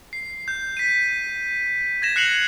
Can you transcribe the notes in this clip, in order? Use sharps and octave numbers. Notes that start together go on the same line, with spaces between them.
C7
G6
B6 D#7
G#6 A#6 E7
F#6 C7 C#7 F7 F#7